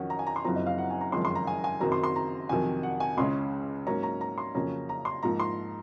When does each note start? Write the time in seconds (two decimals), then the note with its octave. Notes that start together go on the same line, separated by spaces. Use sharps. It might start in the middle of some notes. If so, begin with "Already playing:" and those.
Already playing: F2 D#3 F#3 C#4 F#5
0.10 A#5
0.19 G#5
0.27 A#5
0.36 C6
0.45 F#1 F#2 F3 C4 A#5
0.56 D#5
0.67 F5
0.78 F#5
0.90 G#5
1.01 A#5
1.12 F#1 F2 D#3 G#3 C#4 C6
1.25 C6
1.35 A#5
1.47 G#5
1.64 G#5
1.80 F#1 F#2 D#3 F#3 C4 A#5
1.92 C6
2.04 C6
2.16 A#5
2.49 F2 C3 D#3 F#3 G#5
2.83 F#5
3.00 G#5
3.17 C#2 C#3 G#3 C#4 C6
3.87 G#2 F#3 A#3 C#4 A#5
4.03 A#5
4.21 A#5
4.38 C6
4.54 F2 C#3 F#3 A#3 C#4 A#5
4.89 A#5
5.05 C6
5.23 G#2 F3 A#3 A#5
5.40 C6